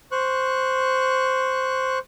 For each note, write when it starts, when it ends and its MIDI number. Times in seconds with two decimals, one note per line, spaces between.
0.12 1.99 72
0.12 1.99 85
0.12 1.99 90